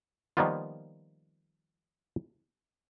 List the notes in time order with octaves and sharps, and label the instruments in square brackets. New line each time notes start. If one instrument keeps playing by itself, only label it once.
[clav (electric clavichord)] D#3 F3 G3 A#3 B3 F4